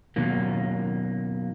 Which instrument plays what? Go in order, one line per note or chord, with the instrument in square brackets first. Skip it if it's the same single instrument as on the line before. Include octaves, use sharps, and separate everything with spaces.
[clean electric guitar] B2 D#3 F#3 A#3